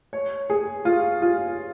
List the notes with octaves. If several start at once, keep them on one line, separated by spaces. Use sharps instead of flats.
C#5
G#4
F4
F4